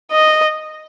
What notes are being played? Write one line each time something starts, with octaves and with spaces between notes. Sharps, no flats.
D#5